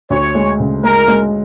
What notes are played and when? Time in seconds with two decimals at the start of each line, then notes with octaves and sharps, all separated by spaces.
0.10 D2 C#5
0.35 G#3
0.60 C#3
0.84 G#3 A#4
1.08 G#3